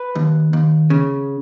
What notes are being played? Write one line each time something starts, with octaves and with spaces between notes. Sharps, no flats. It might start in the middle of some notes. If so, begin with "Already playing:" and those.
Already playing: B4
D#2
D#2
C#3